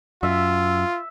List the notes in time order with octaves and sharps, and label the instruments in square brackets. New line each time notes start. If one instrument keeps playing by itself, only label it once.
[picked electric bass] F#2 [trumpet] F4 [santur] E5